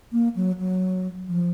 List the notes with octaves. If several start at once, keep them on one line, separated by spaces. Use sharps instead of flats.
A#3
F#3
F#3
F3